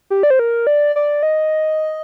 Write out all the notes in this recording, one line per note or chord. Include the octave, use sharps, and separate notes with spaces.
G4
D5
C5
A#4
D5
D5
D#5